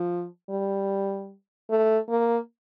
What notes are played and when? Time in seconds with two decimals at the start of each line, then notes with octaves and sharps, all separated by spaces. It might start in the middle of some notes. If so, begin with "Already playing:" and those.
Already playing: F3
0.50 G3
1.70 A3
2.09 A#3